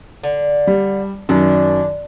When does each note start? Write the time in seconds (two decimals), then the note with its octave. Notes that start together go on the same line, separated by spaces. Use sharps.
0.23 D3
0.67 G3
1.29 F#2 D#3 D4